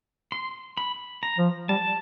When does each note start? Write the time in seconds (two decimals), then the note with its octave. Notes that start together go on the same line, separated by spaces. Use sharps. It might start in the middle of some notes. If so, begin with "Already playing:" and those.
0.32 C6
0.77 B5
1.23 A#5
1.38 F3
1.69 G3 A5